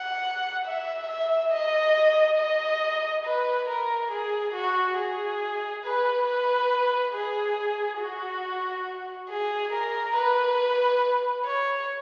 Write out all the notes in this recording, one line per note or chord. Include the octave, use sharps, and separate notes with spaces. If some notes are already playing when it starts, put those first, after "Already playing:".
Already playing: F#5
E5
E5
D#5
D#5
B4
A#4
G#4
F#4
G#4
B4
B4
G#4
F#4
G#4
A#4
B4
C#5